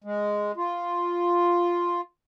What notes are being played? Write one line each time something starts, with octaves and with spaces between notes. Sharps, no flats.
G#3
F4